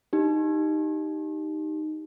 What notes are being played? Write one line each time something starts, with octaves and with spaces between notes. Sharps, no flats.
D#4 G4